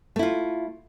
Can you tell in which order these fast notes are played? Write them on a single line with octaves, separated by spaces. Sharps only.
A3 E4 F4